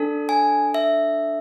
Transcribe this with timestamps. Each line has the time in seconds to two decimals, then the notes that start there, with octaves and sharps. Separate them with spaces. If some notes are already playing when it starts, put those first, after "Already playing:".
Already playing: D4 A4
0.29 G#5
0.74 E5